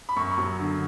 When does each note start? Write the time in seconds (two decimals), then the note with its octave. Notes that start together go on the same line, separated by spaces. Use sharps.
0.09 B5
0.16 F#2 C#6
0.38 F#3
0.59 D3